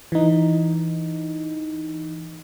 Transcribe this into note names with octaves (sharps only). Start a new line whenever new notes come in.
E3 D#4